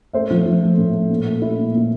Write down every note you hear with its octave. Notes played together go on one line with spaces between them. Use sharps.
A3 C5 E5
F3
F3
A3
A2
A3
A#2
A3
E4
A#2
A#2